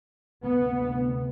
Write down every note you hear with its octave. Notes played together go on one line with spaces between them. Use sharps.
D2 C3 B3